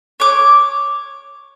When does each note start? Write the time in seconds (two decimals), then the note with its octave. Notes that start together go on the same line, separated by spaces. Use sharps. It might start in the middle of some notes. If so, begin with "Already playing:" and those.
0.20 C#5 D6